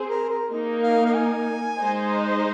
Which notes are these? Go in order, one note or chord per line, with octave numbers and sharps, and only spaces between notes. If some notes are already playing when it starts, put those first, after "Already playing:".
Already playing: C4 G#4 C5
A#4
A#4
A#3 D#4 A#4
F5
F5
G#5
G#3 D#4 C5 D#5